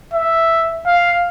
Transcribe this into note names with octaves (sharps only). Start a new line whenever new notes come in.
E5
F5